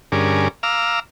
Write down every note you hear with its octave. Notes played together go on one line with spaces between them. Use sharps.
G2 D3 C#4 G#4 A#4 D6
F5 A#5 D6 E6 F6